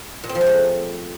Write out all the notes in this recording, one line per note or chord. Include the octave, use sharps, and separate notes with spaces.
A#2
C4
F3
G#3
A3